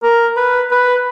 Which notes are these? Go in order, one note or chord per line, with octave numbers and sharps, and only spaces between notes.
A#4
B4
B4